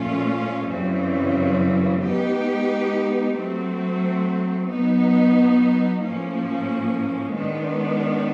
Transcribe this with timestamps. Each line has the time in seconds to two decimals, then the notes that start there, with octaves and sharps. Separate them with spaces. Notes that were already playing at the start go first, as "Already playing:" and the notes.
Already playing: A#2 F3 A3 C#4 F4
0.70 F#2 C#3 E3 G3 C4
2.03 G#3 B3 D#4 G4 B4
3.36 F#3 A3 C4
4.69 F#3 B3 D#4
6.02 A2 F3 A#3 C#4
7.34 D#3 G#3 B3 D4